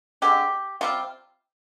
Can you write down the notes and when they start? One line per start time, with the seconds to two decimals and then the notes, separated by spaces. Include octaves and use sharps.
0.22 D3 G#3 C4 G4
0.81 C3 G3 C4 F4